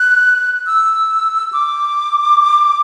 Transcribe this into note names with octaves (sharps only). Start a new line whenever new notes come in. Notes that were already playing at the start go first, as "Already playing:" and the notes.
Already playing: F#6
E6
D6